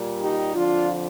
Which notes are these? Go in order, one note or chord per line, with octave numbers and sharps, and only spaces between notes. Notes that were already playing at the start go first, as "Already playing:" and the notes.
Already playing: A#2 G3
D#4 G4
F2 D3 F3 D4 F4